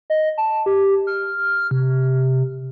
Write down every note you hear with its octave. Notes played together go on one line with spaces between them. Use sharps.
D#5
A5
G4
F6
C3